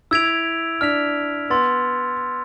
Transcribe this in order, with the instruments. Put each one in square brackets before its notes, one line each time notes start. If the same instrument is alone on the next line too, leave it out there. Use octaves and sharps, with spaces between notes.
[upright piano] E4 [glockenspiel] E6 G#6 B6 D7 F7
[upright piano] D4 [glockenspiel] F6 B6 F7
[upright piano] B3 [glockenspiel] C6 E6 A6